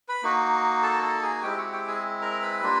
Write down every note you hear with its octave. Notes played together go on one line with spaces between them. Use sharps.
B4 B5
A#3 D#4 F#4
A4 A5
A4 A5
G#4 G#5
G#3 C4 E4 G4 G5
F#4 F#5
G4 G5
G#4 G#5
A#4 A#5
B4 B5
G3 A#3 D4 F4